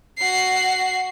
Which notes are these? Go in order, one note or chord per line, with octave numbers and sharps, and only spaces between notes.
F#4 C7